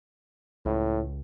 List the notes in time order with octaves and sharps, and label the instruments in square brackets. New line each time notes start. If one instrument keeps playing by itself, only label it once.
[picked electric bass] C#2 [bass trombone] A2